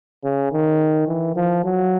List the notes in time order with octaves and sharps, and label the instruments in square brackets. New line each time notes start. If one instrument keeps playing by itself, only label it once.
[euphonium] C#3
D#3
E3
F3
F#3